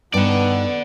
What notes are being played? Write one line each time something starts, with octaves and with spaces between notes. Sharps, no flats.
G2 B3 D#4 D5 F#5